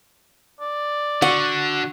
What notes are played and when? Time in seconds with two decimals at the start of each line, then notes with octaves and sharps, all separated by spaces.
0.60 D5
1.22 D3 F#4 F#5